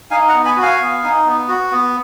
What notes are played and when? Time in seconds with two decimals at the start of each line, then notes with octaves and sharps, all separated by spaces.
0.11 D#4 F5 G#5
0.28 F#5 A#5
0.33 B3
0.45 G#5 B5
0.57 F#4
0.62 F5 G#5
0.80 B3
1.03 D#4
1.26 B3
1.48 F#4
1.71 B3